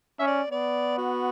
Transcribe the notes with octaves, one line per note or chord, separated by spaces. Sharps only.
C#4 E5
D5
B3 D5
F#4